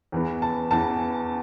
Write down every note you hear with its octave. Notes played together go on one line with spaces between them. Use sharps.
E2 E3 B3
A5
E2 E3 B3 A5